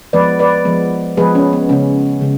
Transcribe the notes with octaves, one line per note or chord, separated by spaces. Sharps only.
F3 G#3 B3 B4 D5
B4 D5
F3 G#3 B3
F3 G#3 B3 G#4 B4
C#4
B3
C#3 G#3 B3 C#4
C#3 G#3